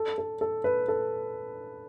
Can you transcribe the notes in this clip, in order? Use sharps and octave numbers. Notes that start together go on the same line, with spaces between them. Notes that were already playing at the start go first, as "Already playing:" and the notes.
Already playing: A4
A4
A4
B4
A4